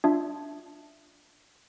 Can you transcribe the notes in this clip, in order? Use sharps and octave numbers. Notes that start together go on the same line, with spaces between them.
D4 F4 E5